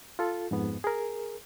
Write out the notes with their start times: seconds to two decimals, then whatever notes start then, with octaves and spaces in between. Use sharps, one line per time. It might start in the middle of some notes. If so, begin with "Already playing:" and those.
0.19 F4 A4
0.51 F2 G#2 B3
0.84 G#4 A#4